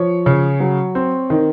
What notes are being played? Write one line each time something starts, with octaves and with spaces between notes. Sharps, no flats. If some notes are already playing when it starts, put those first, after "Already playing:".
Already playing: F3 C#5
C#3
F#3
C4
D#3